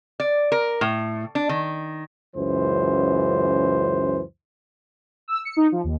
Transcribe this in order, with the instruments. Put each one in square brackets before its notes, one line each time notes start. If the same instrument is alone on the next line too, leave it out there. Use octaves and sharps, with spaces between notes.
[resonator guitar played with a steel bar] D5
A#4
A2
D4
D#3
[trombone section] C#2 F#2 E3 C5
[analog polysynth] E6
C#7
D#4
F3
D#2